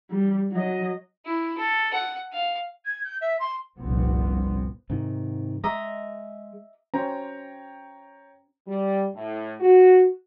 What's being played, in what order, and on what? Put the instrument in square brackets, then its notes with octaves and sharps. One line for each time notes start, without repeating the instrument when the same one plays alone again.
[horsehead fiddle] G3
F#3 D#5
[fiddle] E4
A4
F#5
F5
[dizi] G#6
G6
E5
C6
[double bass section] F1 C2 G2 A#2 B3 C4
[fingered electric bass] G#2 C3 D#3
[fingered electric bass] G#3 [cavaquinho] D#5 E5 A#5
[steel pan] C#4 C5 [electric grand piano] C#5 G5 A#5
[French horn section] G3
A2
F#4